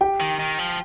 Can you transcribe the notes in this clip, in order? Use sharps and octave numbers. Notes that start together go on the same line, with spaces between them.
G4 G5
D#3
D#3
F3